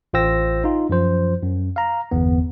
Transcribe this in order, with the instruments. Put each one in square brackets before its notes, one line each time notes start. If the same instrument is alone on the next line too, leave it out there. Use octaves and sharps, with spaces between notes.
[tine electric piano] A1 F4 C5 G5 E6 A#6
D#4 F4
F#2 F3 C5
F#2
F5 A#5
G1 E2 B3